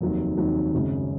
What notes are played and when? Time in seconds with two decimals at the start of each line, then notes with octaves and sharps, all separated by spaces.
0.01 F1 D#2 D#3 F#3
0.37 F1 D#2 D#3 F#3
0.74 G#1 F#2 C#3 G#3